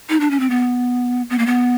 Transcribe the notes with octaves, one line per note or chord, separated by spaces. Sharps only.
D#4
D4
C#4
C4
B3
B3
A#3
B3